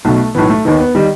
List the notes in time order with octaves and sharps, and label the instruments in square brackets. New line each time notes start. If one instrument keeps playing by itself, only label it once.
[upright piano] B1 B2 A3
B1 A2 E3 B3
A3
D#2 D#3 B3
B3
D#3 G3